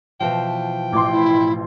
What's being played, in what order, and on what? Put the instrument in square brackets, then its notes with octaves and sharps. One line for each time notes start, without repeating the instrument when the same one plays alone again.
[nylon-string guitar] B2 E3 F3 [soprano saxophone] G5
[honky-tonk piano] A1 C6 [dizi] D6
[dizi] E4